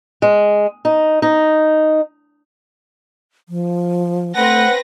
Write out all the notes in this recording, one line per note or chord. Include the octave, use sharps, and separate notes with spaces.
G#3
D#4
D#4
F3
A3 C4 B4 F#5 A#6